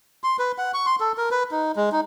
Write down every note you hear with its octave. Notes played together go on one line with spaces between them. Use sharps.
C6
B4
F#5
C#6
C6
A4
A#4
B4
D#4
G#3
D#4